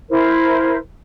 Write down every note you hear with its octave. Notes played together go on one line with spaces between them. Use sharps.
E4 A#4 C5